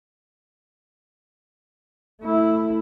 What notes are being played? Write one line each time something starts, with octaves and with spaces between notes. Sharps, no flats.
A3 E4